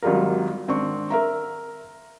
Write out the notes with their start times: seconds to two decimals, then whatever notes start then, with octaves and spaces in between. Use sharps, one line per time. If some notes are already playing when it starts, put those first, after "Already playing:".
0.03 G#1 F#3 G3 F4 A#4
0.68 G#1 C4 D4 C#6
1.10 A#4 E5 A#5